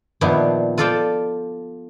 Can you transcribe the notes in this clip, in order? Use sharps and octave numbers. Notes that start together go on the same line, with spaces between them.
A#2 D#3 F3 B3 D4 E4
F4 A4 D5 F5 G5 A5